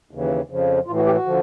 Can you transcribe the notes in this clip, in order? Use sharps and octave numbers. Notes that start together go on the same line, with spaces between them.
D#2 C#3 E3
F2 C#3 F3
A2 E3 F4
F#4
G4
F#4
D3 F3